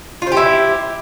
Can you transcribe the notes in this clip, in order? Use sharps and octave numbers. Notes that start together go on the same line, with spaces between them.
E4 F4 G4 C5